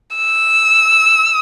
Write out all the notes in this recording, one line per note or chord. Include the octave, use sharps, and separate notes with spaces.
E6